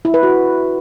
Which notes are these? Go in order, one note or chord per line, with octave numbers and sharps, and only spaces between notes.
E4
B4
F#4